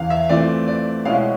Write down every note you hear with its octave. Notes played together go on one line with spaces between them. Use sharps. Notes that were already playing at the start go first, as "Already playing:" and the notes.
Already playing: E2 C#3 E3 F5
E5
E3 A3 C4 F4 D5
D5
B2 G#3 C#4 E4 F5